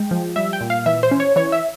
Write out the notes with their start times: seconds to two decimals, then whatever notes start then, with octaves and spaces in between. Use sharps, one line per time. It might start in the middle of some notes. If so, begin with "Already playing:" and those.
Already playing: G#3 G5
0.11 F3
0.36 G3 E5
0.53 G5
0.61 A#2
0.70 F5
0.86 E3 E5
1.03 C5
1.11 C#4
1.20 C#5
1.36 E3 C#5
1.52 E5